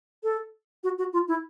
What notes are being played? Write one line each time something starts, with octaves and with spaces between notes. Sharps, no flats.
A4
F#4
F#4
F4
E4